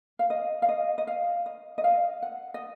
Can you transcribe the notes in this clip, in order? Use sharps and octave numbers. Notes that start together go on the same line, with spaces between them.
F5
D#5
F5
D#5
D#5
F5
D#5
D#5
F5
F#5
D#5